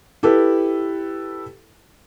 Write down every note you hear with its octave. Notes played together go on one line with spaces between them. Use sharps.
E4 G4 A4 B4